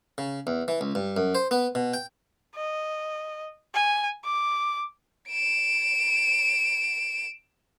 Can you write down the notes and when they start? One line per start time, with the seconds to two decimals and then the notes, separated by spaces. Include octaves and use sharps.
0.18 C#3
0.47 E2
0.68 E3
0.81 C#2
0.95 G2
1.17 F#2
1.35 C5
1.51 B3
1.75 B2
1.94 G5
2.55 D#5
3.75 G#5
4.24 D6
5.28 D7 E7